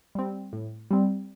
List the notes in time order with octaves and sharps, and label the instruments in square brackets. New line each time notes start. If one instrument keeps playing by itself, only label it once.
[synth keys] G3 C4
A2
G3 C4